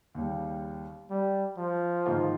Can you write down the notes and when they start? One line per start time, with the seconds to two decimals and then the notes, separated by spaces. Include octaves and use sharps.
0.15 D#2 C#3 G3
1.11 G3
1.58 F3
2.06 G#2 D#3 A#3 F4